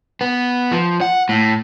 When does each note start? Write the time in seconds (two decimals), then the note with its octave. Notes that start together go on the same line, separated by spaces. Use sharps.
0.21 B3
0.72 F3
1.01 F#5
1.29 A2